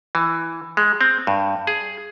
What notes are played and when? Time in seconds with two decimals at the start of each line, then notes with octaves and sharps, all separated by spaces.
0.15 E3
0.77 G#3
1.01 C4
1.27 G2
1.67 G#4